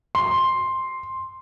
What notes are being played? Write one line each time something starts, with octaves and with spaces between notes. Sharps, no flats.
C6